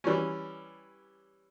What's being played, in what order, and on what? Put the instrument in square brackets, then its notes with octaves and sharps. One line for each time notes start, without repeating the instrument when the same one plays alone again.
[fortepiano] E3 G3 C#4